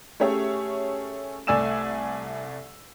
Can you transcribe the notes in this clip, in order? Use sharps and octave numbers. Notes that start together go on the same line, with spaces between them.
A3 C#4 G4 G#4 C#5 E5
C2 A3 D5 G#5 E6 E7